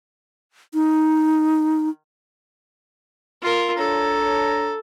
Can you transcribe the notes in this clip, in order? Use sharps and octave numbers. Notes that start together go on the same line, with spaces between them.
D#4
F4 A#4
D4 A4 C#5 A#5